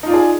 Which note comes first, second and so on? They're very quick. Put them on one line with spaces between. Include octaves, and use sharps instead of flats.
D#4 F4 D5 G#4